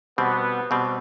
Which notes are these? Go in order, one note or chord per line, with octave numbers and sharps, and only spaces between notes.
B2 G3 B3 C4
B2 G3 C4